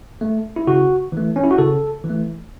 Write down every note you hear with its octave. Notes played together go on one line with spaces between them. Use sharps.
A3
E4
C#3 F#4
E3 A3
C#4
E4
F#4
C#3 A4
E3
A3